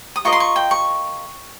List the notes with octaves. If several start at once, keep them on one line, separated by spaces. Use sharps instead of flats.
D#6
F4 A#4 D#5 C#6
C6
C#6
G5
C#6